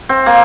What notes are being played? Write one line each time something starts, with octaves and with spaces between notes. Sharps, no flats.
C4
A#3